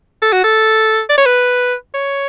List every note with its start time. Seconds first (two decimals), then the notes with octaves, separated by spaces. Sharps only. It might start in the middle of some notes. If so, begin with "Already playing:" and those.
0.22 A4
0.32 F#4
0.44 A4
1.10 D5
1.18 C#5
1.26 B4
1.94 C#5